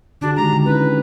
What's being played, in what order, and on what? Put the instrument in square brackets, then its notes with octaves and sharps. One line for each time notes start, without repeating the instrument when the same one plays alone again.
[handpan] D3 F#4 G#4 [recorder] D4
[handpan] D#3 G#3 G4 [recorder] A#5
[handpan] D3
[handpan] C4 C#4 E4 [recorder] B4